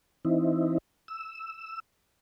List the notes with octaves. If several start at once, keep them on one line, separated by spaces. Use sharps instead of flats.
E3 C4 D#4 E4
E6